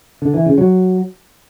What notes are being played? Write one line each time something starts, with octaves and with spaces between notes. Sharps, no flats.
D3
E3
C#3
F#3